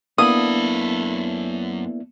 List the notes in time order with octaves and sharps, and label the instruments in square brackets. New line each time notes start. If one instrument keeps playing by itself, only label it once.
[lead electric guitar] F#2 B5 [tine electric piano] A#3 B3 [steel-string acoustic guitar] D4 E4 A4 [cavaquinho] D#6